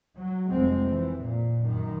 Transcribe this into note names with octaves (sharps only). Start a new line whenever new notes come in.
F#3
F1 G#3 C4
E3
A#2
F#2 D#3